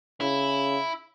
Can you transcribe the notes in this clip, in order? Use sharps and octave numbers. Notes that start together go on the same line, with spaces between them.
C#3 E4